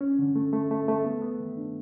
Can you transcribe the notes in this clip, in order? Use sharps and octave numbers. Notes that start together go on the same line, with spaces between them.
C#4
D3
A3
A3
A3
A3
B3
B3
D#3
D4